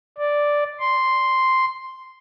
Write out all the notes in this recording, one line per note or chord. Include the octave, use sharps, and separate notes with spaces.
D5
C6